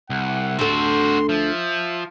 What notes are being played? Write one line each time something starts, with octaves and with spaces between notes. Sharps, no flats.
C2 F#5
D2 C4 F#4 A4 C6
F3 E5